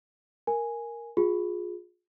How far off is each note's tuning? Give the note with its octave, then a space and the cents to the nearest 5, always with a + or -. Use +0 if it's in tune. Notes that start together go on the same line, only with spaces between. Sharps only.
A#4 +0 G#5 +0
F4 +30 G#4 +0